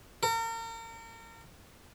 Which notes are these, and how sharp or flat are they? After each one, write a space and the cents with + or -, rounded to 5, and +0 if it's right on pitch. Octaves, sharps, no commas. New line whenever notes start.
A#4 -35